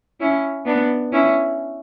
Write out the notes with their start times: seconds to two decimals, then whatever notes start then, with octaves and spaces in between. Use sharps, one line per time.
0.20 C#4 E4
0.66 B3 D4
1.13 C#4 E4